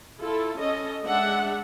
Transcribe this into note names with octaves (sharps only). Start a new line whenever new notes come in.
E4 F4 A4
C#4 A4 D#5
G#3 D4 E5 F#5